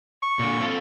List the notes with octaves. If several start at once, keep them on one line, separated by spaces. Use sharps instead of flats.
C#6
A#2 D3
C4 F4 A4